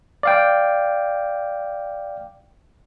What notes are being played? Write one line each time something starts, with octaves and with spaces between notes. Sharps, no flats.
D5 F5 G5